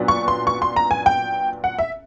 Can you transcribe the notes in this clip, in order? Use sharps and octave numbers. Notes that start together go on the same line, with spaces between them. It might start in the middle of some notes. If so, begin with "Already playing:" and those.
Already playing: A#2 F#3 B3 D4
C#6
C6
C#6
C6
A#5
G#5
G5
F#5
E5